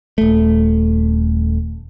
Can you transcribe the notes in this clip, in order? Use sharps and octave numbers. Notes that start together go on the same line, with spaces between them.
D#1 A3